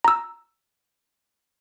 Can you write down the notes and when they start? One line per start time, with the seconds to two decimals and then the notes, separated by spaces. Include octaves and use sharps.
0.05 A#5 E6